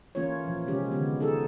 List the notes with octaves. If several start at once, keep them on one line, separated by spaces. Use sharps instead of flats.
E3 A#3 C#4 F4 C#5
A#2 F3
C3 D#3 G#3 C#4 G4
D3 G#3 B3
B3 D#4 G#4 A4